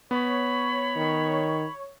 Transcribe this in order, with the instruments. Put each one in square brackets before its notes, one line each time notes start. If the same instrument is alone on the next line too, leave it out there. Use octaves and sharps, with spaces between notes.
[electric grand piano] B3 [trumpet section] C#5 [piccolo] B5
[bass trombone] D#3